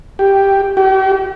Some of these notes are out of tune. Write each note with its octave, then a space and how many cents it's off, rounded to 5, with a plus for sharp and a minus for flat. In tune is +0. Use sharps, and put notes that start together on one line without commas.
G4 +0
G4 -40